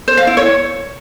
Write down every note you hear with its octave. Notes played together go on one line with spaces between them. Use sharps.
C5
F5
E4
C#5